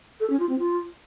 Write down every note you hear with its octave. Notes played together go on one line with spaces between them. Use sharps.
A4
C#4
F4
C4
F4